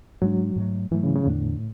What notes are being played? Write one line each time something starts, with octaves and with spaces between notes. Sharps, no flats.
G#2 F#3 G#3 D4
G#2 F#3 A3
G#2 E3 F#3 A3
C#3
C#3
E2 A2 D3 A3 D4